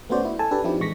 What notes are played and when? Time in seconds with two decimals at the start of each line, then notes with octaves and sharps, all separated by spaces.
0.09 A3 B3 C#4 F#4 C5 D5
0.25 E4
0.39 A4 G#5 A5
0.51 D4 G4 A4 B4
0.64 F3 C4 D#4 E4 G4
0.79 A1 E3 G#3 C#6 A#6 B6